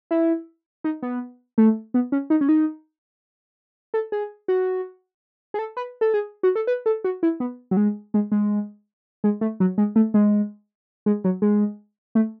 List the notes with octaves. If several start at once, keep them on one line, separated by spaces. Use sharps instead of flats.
E4
D#4
B3
A3
B3
C#4
D#4
C#4
D#4
A4
G#4
F#4
G#4
A4
B4
A4
G#4
F#4
A4
B4
A4
F#4
E4
B3
F#3
G#3
G#3
G#3
G#3
A3
F#3
G#3
A3
G#3
G#3
F#3
G#3
A3